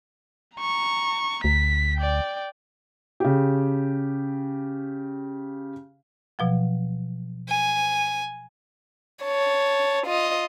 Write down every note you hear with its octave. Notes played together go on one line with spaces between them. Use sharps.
A#5 C#6
D2 B6
D5 G5
C#3 G4
B2 F3 F#3
G#5
C#5 A5
F4 D#5